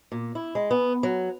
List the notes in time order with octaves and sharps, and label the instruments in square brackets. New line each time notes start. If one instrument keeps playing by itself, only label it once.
[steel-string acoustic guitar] A#2
E4
G#3
B3
F#3